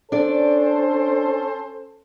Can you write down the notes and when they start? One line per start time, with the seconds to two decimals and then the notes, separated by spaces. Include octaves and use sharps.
0.12 C#4 D4 A4 C5 D5